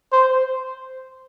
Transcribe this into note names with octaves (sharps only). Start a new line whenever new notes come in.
C5